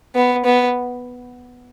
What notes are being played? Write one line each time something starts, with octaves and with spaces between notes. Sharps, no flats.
B3
B3